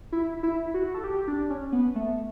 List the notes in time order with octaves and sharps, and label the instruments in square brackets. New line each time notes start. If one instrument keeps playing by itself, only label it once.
[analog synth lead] E4
E4
F#4
A4
G4
D4
C#4
B3
A3